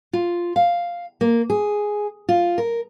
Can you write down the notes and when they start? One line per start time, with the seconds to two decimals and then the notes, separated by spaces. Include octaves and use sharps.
0.13 F4
0.56 F5
1.21 A#3
1.50 G#4
2.29 F4
2.58 A#4